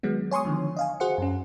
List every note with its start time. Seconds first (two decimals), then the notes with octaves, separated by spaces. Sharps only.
0.03 D#3 F#3 G#3 B3
0.31 C#5 G#5 C6 C#6 D#6
0.45 D3 D#3 F3
0.77 D#5 F5 G#5
1.00 F#4 G#4 C5 F#5 C#7
1.18 F#2 C#4